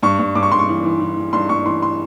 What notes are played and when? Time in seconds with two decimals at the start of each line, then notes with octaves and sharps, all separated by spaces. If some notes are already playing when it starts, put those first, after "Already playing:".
0.03 G2 C#6
0.19 G2
0.35 G2 D6
0.43 C#6
0.52 G2 C6
0.59 C#6
0.69 E3
0.84 E3
1.00 E3
1.17 E3
1.33 G2 C6
1.49 G2 C#6
1.65 E3 C6
1.82 C6